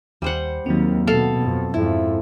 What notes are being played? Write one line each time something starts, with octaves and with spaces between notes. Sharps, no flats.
D#2 G3 C5 F#5
D#2 D#3 F#3 C4
B2 A4 F5
F2
F2 G#2 E4